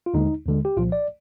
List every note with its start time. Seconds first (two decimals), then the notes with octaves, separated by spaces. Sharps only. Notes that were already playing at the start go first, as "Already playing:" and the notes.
0.06 F4
0.14 D#2 D3 G#3 D#4
0.46 D#2 D3 G#3
0.65 G4
0.77 C2 A#2 F3 F4
0.92 D5